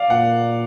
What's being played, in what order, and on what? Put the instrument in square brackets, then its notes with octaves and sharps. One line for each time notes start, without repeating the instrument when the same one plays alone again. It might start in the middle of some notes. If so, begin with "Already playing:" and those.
Already playing: [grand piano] D5 F5
[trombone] A#2 [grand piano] F#5